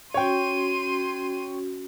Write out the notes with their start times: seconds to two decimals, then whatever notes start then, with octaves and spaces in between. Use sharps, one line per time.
0.14 C#4 F#4 C#5 G5 C6 D#7